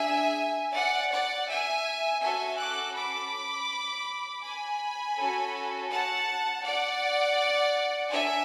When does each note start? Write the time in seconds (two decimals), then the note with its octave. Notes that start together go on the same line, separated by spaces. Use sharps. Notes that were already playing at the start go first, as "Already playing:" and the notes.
Already playing: D4 G#4 E5 G#5
0.73 D5 F#5
1.11 D5 F#5
1.48 E5 G#5
2.21 C#4 F#4 A4 E5 G#5
2.58 D6 F#6
2.95 B5 D6
4.43 G#5 B5
5.17 C#4 F#4 A4
5.90 F#5 A5
6.65 D5 F#5
8.12 D4 E5 G#5